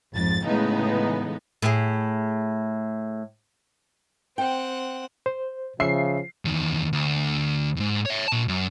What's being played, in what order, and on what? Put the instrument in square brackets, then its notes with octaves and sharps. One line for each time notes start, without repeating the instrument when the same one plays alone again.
[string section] G#1 F2 G#2 A6
A2 C#3 E3 G#3 B3 D#4
[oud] A2 G#4
[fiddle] C4 F#5 [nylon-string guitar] G5
[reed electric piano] C5
[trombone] C#3 [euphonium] F3 [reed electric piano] E5 [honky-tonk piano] C7
[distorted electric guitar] E2 D#3
D2
E2 G#2
C#5 E5
A#2 A5
F#2